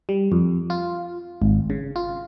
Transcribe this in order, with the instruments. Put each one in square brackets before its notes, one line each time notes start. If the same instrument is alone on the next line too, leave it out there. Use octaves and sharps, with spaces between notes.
[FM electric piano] G3
F2
F4
G#1
C#3
F4